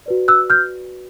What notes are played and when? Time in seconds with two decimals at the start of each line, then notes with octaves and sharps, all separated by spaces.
0.06 F#4 B4 D5
0.28 E6 F#6
0.50 F6 G6